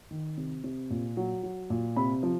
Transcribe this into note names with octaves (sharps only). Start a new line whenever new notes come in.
D#3
C3
C3
A#2
F#3
F#3
A#2
C3 B5
F3